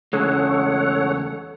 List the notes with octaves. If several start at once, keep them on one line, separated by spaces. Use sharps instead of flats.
E2 C#3 G#3 A4 C#5 F#5